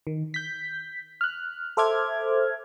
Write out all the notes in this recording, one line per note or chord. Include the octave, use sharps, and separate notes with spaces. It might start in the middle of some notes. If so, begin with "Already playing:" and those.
D#3
G6 B6
F6 F#6
A4 C5 E5 D6 F6 G#6